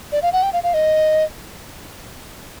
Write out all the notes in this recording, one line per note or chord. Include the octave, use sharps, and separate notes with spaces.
D5
F5
F#5
G5
F5
F5
D#5